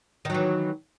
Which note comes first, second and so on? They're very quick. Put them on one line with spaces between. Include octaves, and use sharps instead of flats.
D#3 F#3 E3